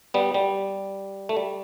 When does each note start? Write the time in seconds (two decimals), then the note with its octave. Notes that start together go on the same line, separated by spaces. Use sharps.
0.14 G3 B3
0.34 G3
1.29 A3
1.37 G3